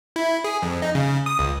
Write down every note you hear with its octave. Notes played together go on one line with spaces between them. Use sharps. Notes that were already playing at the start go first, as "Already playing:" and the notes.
E4
G#4
F2
D#4
C#3
D#6
C#2